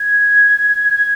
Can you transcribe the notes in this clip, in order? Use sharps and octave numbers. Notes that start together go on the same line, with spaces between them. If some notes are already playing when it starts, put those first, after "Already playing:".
Already playing: G#6
G#6